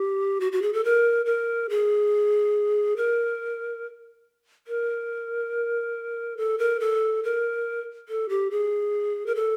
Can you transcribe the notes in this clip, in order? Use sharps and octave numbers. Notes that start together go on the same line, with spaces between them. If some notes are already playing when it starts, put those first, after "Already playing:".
Already playing: G4
F#4
F#4
G#4
A4
A#4
A#4
G#4
A#4
A#4
A4
A#4
A4
A#4
A4
G4
G#4
A#4
A4